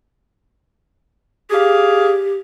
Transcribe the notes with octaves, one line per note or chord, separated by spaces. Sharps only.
G4 G#4 D5 F5